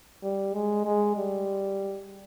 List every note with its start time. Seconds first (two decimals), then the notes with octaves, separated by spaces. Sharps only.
0.23 G3
0.53 G#3
0.85 G#3
1.17 G3